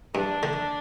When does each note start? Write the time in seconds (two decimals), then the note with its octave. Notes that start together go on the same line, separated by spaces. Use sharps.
0.15 G2 D4
0.43 D3